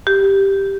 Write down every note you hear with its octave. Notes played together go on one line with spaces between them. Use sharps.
G4